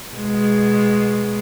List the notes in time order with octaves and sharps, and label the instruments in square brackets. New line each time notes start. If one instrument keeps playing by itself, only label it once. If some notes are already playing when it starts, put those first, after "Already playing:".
[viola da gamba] B2 G#3